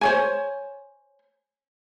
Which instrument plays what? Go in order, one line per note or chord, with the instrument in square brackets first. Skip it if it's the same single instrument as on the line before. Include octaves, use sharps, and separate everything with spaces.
[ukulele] C5 C#5 G#5